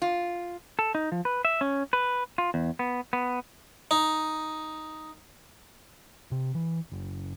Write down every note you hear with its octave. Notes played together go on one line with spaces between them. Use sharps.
F4
A4
D#4
F3
B4
E5
C#4
B4
F4
E2
B3
B3
D#4
C3
E3
F#1